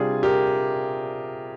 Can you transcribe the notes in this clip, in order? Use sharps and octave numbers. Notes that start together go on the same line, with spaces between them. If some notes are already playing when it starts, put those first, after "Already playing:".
Already playing: C3 G3 D4 F4 G#4
G4 A#4